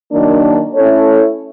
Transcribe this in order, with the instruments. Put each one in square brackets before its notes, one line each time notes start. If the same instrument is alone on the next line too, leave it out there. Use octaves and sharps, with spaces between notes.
[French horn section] D#3 F#3 A#3 D4
A3 C#4 E4 A4 C#5